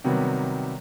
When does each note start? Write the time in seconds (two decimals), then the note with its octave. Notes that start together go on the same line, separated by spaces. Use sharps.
0.04 C3 D#3 F#3 G3 B3